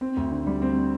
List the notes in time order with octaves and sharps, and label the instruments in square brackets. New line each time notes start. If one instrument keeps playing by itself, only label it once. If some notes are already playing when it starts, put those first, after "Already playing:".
[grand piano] C4
D2
D3
G3
C4